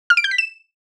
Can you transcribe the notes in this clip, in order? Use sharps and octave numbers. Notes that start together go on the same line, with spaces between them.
F6
D7
G6
B6
E7